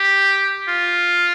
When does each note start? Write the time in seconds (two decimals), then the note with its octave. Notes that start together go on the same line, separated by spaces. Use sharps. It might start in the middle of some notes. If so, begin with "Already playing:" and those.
Already playing: G4
0.68 F4